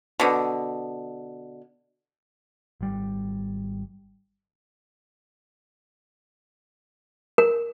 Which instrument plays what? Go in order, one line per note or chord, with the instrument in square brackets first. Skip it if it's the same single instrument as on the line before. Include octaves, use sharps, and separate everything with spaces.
[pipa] B2 D3
[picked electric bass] G#1 G3
[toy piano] A#4